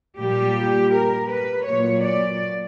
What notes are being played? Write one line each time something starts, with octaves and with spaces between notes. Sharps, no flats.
A#2 G3 G4
A#4
B4
A#2 F#3 C#5
D5